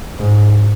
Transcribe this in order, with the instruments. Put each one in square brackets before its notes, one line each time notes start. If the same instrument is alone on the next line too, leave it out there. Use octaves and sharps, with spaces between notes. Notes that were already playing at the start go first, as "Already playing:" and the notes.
[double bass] G#2